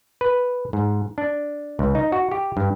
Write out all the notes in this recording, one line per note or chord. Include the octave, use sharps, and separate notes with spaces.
B4
G#2
D4
C#2
D#4
F#4
G4
G2